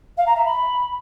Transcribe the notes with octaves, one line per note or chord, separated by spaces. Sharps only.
F5
A#5
E5
B5